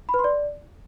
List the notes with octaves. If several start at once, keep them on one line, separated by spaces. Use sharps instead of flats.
B5
B4
C6
D5